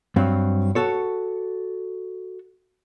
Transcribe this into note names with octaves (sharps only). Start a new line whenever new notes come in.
G2 F#3 C4
F#4 A4 C#5